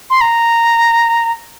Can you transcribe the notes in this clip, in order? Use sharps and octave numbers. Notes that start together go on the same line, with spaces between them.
C6
A#5